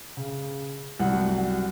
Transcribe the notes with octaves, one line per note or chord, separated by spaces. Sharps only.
C#3
C2 F#2 F#3 G3 F#5